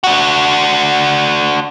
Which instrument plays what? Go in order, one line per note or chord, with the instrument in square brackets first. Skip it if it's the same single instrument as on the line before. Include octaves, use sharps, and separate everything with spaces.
[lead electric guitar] D4 F#4